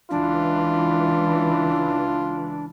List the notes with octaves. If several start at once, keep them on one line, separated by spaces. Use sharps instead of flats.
C#2 E3 D4 F4